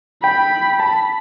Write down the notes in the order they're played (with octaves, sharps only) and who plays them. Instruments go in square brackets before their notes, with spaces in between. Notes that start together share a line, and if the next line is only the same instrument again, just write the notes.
[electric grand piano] G5 [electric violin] B5
[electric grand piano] A5 [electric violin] B5